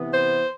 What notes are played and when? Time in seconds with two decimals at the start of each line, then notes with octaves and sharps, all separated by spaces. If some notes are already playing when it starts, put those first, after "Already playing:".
Already playing: C3 E3 B3
0.11 C5